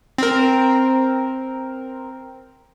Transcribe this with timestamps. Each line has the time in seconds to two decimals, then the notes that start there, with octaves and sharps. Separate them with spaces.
0.18 C4 A#4